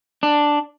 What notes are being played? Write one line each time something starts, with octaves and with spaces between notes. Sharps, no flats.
D4